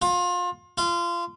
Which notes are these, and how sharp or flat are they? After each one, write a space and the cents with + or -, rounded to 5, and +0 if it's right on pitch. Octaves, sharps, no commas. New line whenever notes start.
F4 +30
F4 -25